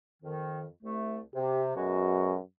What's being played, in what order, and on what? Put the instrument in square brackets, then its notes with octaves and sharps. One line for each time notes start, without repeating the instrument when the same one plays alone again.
[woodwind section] F2 D#3
C2 A3
[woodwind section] C3 [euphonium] G4
[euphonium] F#2 [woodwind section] B2 G#3 F#4